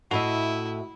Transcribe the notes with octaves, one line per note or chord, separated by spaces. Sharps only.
A2 E4 F#4 D#5 E5